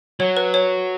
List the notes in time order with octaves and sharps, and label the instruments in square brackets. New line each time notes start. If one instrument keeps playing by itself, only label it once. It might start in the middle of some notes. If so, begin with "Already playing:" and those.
[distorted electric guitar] F#3 [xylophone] C#5
[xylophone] B4
C#5